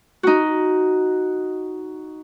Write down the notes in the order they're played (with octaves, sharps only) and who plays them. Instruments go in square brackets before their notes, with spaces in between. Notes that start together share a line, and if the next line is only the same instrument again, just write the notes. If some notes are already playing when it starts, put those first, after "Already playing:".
[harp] D#4 F#4